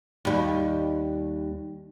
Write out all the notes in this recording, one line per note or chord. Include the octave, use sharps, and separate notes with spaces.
D#2 G3